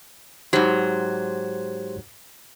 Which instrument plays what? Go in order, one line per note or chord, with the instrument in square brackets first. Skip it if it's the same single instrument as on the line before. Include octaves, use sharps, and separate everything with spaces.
[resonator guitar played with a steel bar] G#2 F#3 [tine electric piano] G4 C5 C6